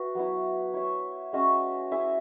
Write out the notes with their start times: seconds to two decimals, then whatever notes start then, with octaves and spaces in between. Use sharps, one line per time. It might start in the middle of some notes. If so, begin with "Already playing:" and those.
Already playing: F#4 B4 E5
0.15 F#3 B3 E4
0.73 E4 C#5 E5
1.33 G#3 C#4 F#4 E5
1.91 E4 G#4 E5